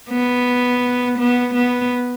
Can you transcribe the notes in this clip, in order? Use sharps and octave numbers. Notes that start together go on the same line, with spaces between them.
B3
B3
B3